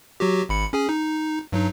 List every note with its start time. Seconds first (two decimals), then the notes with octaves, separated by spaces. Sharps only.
0.20 F#3 F#4 G4
0.49 G#1 B5 C#7
0.73 C#4 G#4 G#5
0.89 D#4
1.52 G2 F#3 D#4